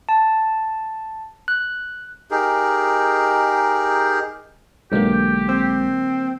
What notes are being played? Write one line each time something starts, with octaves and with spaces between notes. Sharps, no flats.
A5
F#6
D#4 G4 G#4 A#4
B1 D3 F#3 G#3 A#3 G4
C4